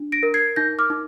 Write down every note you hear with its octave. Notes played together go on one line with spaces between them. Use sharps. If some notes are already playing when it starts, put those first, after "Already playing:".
Already playing: D4
A#6 D7
A#4
G#6 C7
D#4 G6 A#6
D6 F6
D#4